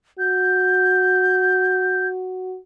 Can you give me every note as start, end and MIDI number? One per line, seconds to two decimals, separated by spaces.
0.19 2.58 66
0.19 2.08 91